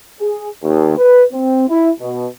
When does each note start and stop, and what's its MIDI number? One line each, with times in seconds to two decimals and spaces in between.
0.20 0.48 68
0.64 0.95 39
0.98 1.24 71
1.33 1.68 60
1.69 1.90 64
2.00 2.26 47